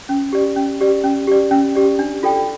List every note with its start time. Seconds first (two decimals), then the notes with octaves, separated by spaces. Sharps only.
0.09 C#4
0.33 G4 D5
0.56 C#4
0.81 G4 D5
1.04 C#4
1.27 G4 D5
1.51 C#4
1.75 G4 D5
1.99 D4
2.23 F4 A4 D5 G5